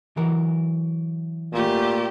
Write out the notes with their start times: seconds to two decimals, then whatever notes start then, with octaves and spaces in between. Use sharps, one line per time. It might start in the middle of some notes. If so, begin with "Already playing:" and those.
0.17 E3 F#3 A#4
1.53 A#2 A3 G4